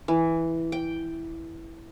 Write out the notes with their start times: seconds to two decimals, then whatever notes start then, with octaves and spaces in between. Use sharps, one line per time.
0.08 E3
0.72 G5